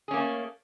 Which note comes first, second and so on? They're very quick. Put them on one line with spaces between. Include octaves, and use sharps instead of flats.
G#4 C#4 A#3 A3